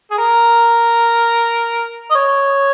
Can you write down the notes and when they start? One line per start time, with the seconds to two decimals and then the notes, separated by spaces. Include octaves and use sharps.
0.11 G#4
0.18 A#4
2.10 D#5
2.15 C#5